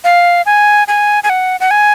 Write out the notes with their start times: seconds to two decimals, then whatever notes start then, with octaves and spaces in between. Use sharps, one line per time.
0.04 F5
0.46 G#5
0.88 G#5
1.24 G#5
1.30 F#5
1.60 F#5
1.71 G#5